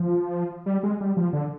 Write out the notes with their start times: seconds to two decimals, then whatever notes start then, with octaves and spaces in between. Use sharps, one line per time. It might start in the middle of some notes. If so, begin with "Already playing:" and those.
Already playing: F3
0.66 G3
0.83 G#3
1.01 G3
1.17 F3
1.33 D3